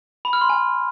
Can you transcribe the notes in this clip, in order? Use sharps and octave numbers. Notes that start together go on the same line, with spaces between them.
B5
F6
C6
G#5